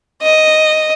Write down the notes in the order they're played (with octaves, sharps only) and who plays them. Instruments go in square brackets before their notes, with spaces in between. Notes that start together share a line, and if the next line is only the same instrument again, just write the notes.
[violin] D#5